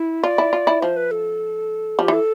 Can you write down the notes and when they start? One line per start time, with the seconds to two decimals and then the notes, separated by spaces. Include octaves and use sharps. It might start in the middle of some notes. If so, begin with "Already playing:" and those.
Already playing: E4
0.24 F4 D5
0.38 E4
0.53 F4
0.67 E4
0.82 F3 C5
0.96 B4
1.11 A4
1.99 F3 G4
2.08 E3
2.13 A4